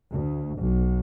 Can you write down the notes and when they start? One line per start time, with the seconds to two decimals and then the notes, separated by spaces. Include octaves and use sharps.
0.11 D2
0.59 B1